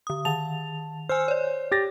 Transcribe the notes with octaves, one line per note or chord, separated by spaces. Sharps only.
D3 D#6
D#3 A5 F7
C5 G#5 E6 F6
C#5 D5
G4 A6 A#6